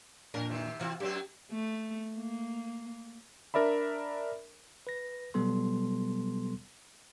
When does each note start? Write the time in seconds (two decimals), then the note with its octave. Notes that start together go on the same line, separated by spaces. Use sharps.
0.34 F2 A#2 D4 A#4
0.49 C3 D#3
0.80 C3 E3 C4 F4 F#4
1.00 F#2 F#3 C4 G4
1.52 A3
2.15 A#3
3.54 D4 A#4 D5 E5 B5
4.87 B4 A#6
5.34 B2 F#3 G3 B3 A4 C6